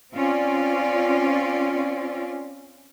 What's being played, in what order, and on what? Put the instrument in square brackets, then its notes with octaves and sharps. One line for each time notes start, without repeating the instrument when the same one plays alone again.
[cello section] C4 C#4 F4 D5